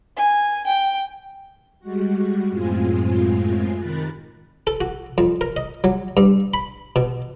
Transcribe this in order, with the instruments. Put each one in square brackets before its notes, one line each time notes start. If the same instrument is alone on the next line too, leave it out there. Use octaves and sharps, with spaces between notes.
[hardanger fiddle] G#5
G5
[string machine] G3 G#3 F#4
F#2 A2 G#3 C4 F4 G#5
C3 D#3 A#4 B5 F#6 A6
[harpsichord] A4
F#4
F2
A#4
D#5
F#3
G2
B5
B2